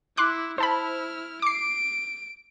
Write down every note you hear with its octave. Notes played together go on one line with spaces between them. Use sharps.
E4 C6 D6 F#6
E4 C5 A5 B5 F6
D6 C7 D7